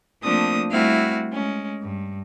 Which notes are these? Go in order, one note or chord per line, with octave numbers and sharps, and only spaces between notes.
F3 A3 A#3 C4 D4 D#6
G3 A3 C4 E4 F#4 F5
G#3 C#4
G2